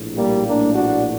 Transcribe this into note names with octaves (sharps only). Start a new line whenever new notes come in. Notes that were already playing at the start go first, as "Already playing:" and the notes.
Already playing: A#1 A2
G3 A#3
A#3 D4
D4 F#4